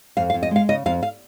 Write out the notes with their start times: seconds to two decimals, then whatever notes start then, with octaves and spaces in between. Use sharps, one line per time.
0.17 F2 F5
0.30 F5
0.34 F2
0.43 D#5
0.51 G#3 F5
0.69 C#3 D#5
0.86 F2 F5
1.03 F5